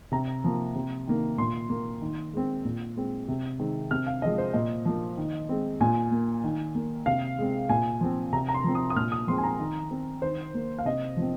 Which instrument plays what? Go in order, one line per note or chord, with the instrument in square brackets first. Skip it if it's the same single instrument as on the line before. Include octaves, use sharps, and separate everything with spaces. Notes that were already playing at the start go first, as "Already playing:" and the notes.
[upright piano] C3 A#5
F3 A#3
C3
D#3 A#3
A#2 C6
A#3
D#3
G#3 C4
A#2
G#3 C4
C3
D#3 G#3 C4
C3 F6
F5
F3 G#3 C4 D#5
C5
A#2 D#5
F3 A#3
D#3
G#3 C4
A#2 G#5
A#3
D#3
A#3
C3 F5
G#3 C4
A#2 G#5
F3 C4
C3 A#5
A#5
C6
F3 C4
D#6
D#6
A#2 F6
D#6
F3 G#3 C4 C6
G#5
A#5
D#3
C4
D#3 C5
A#3
F5
C3 D#5
F3 C4